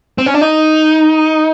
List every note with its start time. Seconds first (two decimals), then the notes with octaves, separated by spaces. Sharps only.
0.18 C4
0.26 C#4
0.34 D4
0.41 D#4